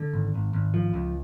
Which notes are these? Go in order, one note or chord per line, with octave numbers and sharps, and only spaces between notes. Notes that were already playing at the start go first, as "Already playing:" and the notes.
Already playing: D3
G#1
G#1
G#1
F3
C#2